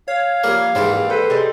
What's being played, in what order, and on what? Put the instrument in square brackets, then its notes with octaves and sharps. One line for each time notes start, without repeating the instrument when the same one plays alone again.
[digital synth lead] C#5 [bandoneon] F5
[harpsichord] F3 G3 A#3 [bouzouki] A#4
[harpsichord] A#1 E3 G#3 [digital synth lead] G#2 [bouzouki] G3 C4 E4
[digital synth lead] A4 [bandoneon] B4 C5
[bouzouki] G3 G#3 D#4